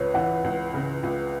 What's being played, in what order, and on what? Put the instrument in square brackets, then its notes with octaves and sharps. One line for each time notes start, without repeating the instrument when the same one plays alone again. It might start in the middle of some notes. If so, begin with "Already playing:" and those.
Already playing: [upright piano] C#2 C#3 [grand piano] B4 C#5
[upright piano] E3 [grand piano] F#5
[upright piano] C#2
C#3
C#2